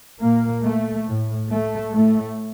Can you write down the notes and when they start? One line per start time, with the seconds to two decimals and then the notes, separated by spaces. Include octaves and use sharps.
0.20 A#2 A#3
0.64 A3
1.06 A2
1.49 A3
1.91 A2 A3